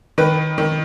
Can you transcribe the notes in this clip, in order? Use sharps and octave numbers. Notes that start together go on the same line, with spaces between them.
D#3 B4
D#3